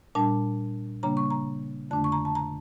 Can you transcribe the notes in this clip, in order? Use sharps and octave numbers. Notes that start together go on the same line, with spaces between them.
A#2 G3 D4 A5
C#3 G3 A#3 D4 A#5
C#6
A#5
F2 D3 A3 D4 A5
C#6
A#5
A5
A#5